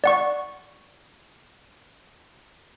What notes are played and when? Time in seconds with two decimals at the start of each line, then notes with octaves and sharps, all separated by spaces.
0.04 D5 F#5 C#6